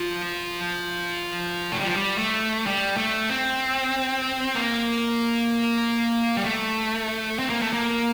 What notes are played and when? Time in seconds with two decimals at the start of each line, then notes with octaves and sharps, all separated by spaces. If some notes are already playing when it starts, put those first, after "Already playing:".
Already playing: F3
1.72 A3
1.80 G3
1.87 F3
1.95 G3
2.18 A3
2.66 G3
2.97 A3
3.30 C4
4.55 A#3
6.37 G3
6.44 A3
7.39 C4
7.50 A#3
7.62 A3
7.73 A#3